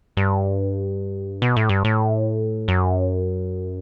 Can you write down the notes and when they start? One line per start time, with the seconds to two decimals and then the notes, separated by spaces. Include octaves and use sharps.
0.17 G2
1.42 B2
1.56 A2
1.69 G2
1.85 A2
2.68 F#2